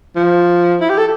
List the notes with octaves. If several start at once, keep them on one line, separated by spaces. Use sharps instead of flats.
F3
E4
G4
A4